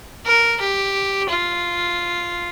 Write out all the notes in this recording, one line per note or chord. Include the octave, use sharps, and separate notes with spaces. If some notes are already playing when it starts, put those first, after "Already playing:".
A#4
G4
F4